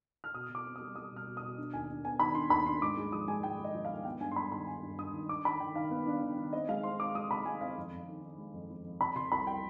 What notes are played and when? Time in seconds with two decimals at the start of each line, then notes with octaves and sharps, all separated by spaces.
0.24 F6
0.34 B2 D#6
0.49 B2
0.55 D6
0.65 C4
0.76 G3 D#6
0.96 G3 D#6
1.12 B2 F6
1.27 B2
1.37 D#6
1.43 B2
1.58 D4
1.74 D#2 G#5
1.89 D4
2.04 B3 G#5
2.20 D#3 B5
2.35 D4 C6
2.50 D#2 B5
2.66 D4 C6
2.82 G#2 D6
2.97 G#3
3.12 F3 D#6
3.28 G#3 G#5
3.43 G#2 G5
3.59 G#3 D#5
3.74 F3
3.85 F5
3.91 G#2
4.05 B3 G5
4.20 G2 G#5
4.31 C6
4.36 G2 B5
4.52 D#3 B5
4.67 D#3 G#5
4.83 G2
4.98 G2 D#6
5.13 D#3
5.29 D4 D6
5.45 D#3 B5
5.60 D#3 G5
5.76 D#3 F5
5.91 B3
6.07 D4
6.22 D#3
6.38 D#3
6.53 C4 D#5
6.69 G#3 F5
6.83 C4 C6
6.99 C4 D6
7.15 G#3 D#6
7.30 C3 B5
7.45 G#3 G#5
7.61 C4 F5
7.77 F2
7.92 F2
8.08 D#3
8.23 D#3
8.38 G#3
8.54 F2
8.70 F2
8.85 F2
9.01 C3 B5
9.15 C3 C6
9.32 C2 B5
9.47 G5